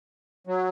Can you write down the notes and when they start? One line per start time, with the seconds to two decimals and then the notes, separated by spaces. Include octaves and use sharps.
0.47 F#3